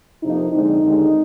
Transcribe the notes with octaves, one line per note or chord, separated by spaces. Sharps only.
F2 C3 F3 A#3 D#4
F2 D3 G#3 C4 D#4
D#2 D3 G#3 C4